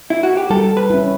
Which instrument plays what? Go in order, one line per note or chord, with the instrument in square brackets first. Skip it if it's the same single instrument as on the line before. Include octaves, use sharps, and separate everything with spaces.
[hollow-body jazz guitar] E4
F#4
G4
[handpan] G3 [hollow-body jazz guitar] A4
[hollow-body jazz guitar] B4
[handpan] C#4 E4